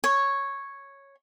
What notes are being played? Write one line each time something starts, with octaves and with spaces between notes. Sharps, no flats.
C#5